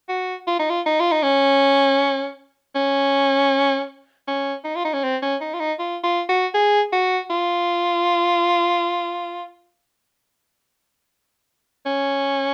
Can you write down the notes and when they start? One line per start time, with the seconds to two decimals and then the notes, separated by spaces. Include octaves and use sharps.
0.09 F#4
0.48 F4
0.59 D#4
0.70 F4
0.86 D#4
1.00 F4
1.12 D#4
1.23 C#4
2.75 C#4
4.28 C#4
4.65 D#4
4.76 F4
4.85 D#4
4.94 C#4
5.03 C4
5.22 C#4
5.41 D#4
5.54 F4
5.60 D#4
5.79 F4
6.04 F4
6.29 F#4
6.54 G#4
6.93 F#4
7.30 F4
11.86 C#4